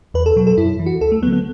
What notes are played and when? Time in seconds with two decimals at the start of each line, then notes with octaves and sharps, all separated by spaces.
0.14 E2 B4
0.26 A4
0.36 B2 F#3
0.47 A4
0.58 F#2 E4
0.79 E3
0.86 F#4
1.01 D2 A4
1.12 A3
1.22 F#3 B3
1.27 D3
1.32 B3